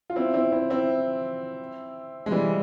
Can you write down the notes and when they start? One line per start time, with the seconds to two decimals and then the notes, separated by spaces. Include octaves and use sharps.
0.10 F4
0.16 C4 E4
0.34 C4 E4
0.52 C4 E4
0.70 C4 E4
2.26 G#3
2.31 E3 G3